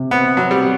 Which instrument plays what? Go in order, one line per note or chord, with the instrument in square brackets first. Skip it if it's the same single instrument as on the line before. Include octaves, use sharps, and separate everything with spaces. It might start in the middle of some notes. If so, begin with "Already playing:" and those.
Already playing: [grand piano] C3
[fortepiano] B3 [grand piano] C4
[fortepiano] F#3 [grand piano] C4
[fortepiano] G3